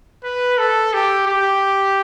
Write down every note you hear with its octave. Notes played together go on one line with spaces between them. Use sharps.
B4
A4
G4
G4